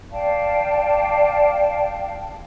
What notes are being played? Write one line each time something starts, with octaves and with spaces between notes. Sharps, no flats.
D5 F5 G5 A5